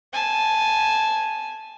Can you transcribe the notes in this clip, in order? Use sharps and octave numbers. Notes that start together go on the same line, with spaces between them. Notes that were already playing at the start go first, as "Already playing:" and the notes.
G#5 A5